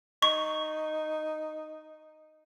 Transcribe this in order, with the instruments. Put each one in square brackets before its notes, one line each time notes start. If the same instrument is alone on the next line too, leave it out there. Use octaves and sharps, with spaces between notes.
[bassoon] D#4 [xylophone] C#6